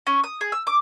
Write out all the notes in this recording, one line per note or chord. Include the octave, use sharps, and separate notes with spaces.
C#4
D#6
G#4
E6
D6